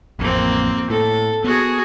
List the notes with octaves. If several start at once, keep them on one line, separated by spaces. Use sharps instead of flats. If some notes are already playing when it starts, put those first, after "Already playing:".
A1 F2 A#3 C4
A2 A4
B3 F#4 G#4